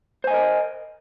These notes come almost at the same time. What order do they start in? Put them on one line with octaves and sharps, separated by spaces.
C5 G#5 D#5 A#4